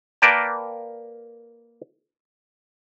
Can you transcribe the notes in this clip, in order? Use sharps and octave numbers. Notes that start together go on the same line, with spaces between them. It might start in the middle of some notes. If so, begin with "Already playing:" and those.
A#3 A#4 B4 D5 G5 A5